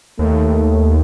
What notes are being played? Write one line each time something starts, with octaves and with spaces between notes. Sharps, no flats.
D#2 A3